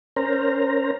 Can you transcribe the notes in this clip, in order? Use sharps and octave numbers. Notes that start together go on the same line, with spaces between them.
C#4 A#4 C5 A#5